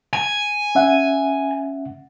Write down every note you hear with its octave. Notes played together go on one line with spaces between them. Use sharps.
G#5
C#4 E5 F#5